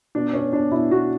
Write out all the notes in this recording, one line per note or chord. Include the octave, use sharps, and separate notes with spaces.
B2 D4
B2 C#4
B2 D4
B2 E4
B2 F#4